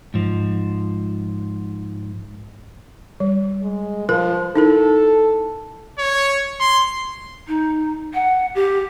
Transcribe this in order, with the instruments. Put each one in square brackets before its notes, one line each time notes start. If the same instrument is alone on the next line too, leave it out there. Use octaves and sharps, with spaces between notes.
[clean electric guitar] G#2 F3
[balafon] G3
[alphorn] G#3
[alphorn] F3 [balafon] F4 A#4 B4
[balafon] D#4 E4 A#4 [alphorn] A4
[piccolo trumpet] C#5
C6
[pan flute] D#4
F#5
G4